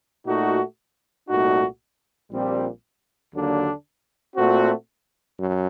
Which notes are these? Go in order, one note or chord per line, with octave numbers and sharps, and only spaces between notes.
A#2 A3 D#4 F#4
C2 A#2 A3 D#4 F#4
A#1 A#2 G3 C4 G4
D#2 D3 F#3 A#3 D4
A#2 A3 C4 F#4
F#2